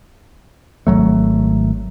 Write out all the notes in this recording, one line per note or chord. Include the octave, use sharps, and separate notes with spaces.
G#1 F#2 F#3 A3